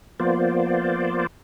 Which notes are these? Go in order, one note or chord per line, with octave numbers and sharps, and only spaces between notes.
F3 A#3 B3 F4 C5 D5